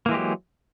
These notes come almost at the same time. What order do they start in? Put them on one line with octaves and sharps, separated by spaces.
A#3 E3 G#3 G4 F#3